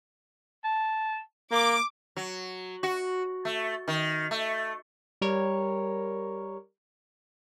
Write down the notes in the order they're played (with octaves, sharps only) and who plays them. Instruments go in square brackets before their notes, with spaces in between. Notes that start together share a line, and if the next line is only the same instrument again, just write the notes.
[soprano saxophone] A5
[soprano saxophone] A#3 [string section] D6
[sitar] F#3
F#4
A3
D#3
A3
[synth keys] G3 A#4 C#5